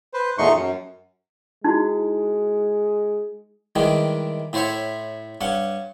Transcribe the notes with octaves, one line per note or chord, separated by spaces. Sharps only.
B4 C5
E2 A#2 A3 D#4 C6 C#6
F#2
G#3 D#4 E4 F#4
D#3 E3 G3 G#3
A2 E4 C5 C#5 E5
G2 C#4 F#5